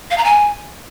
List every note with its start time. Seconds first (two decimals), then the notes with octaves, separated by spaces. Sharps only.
0.11 F5
0.18 A#5
0.25 G#5